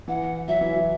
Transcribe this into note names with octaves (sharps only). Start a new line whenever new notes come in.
E3 F#5
F#3 E5
E3
F#3